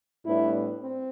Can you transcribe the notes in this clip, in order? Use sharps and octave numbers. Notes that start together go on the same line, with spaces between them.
A2 G3 B3 D4 E4
C4